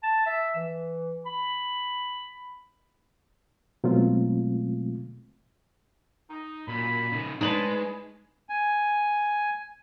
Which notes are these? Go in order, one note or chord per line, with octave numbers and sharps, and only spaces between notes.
A5
E5
E3
B5
B2 F#3 G#3 A3 C4 F4
D#4
F#2 A#2 B5
C#3 D#4
G#3 D4 D#4 B4 C#5 A5
G#5